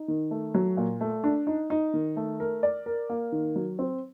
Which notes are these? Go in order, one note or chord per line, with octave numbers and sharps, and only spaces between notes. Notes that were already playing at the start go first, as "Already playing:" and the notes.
Already playing: D#4
D#3
A3
F#3
A#2
A3
D4
D#4
D#4
D#3
A3
A#4
D5
A#4
A#3
D#3
F#3
C4